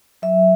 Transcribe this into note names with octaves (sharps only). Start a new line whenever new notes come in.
F#3 E5